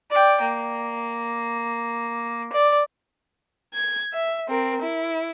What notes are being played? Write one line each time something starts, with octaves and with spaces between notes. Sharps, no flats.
D5 G5
A#3
D5
G#6
E5
C4 A#4
E4